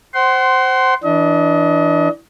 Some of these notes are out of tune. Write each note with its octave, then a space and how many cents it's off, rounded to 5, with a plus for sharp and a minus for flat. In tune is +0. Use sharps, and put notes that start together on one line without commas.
C5 +0 F#5 +35 C6 -5
E3 +0 D4 +0 D#5 +30